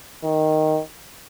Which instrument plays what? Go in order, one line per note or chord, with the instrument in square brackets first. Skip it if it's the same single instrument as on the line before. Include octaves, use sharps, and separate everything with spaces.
[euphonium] D#3